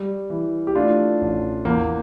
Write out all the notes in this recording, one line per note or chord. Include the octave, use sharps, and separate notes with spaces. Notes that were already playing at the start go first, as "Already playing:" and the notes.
Already playing: G3
E3
G4
A3 D4 F4
A1
E2 A#3